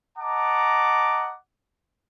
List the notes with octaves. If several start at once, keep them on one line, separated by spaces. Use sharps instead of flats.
D#5 F#5 A5 A#5 D6